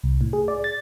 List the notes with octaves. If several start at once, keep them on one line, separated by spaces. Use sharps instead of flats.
C2
A2
G#4
D5
A6